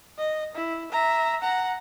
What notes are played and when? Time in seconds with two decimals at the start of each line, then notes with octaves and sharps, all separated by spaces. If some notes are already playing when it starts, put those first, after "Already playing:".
0.18 D#5
0.55 E4
0.92 E5 A#5
1.41 F#5 A#5